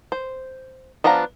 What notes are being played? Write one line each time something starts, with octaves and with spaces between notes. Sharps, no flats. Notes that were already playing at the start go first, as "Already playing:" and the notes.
C5
F3 B3 D4 F5 A#5